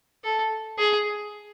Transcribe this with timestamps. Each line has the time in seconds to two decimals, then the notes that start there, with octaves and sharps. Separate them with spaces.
0.24 A4
0.78 G#4